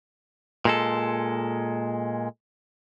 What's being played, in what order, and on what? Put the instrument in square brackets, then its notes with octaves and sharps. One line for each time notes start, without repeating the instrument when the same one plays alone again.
[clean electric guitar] A#2 G#3 A4